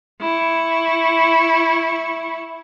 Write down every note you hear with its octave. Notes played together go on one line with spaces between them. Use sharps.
E4 C#6